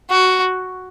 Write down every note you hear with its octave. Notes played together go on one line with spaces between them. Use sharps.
F#4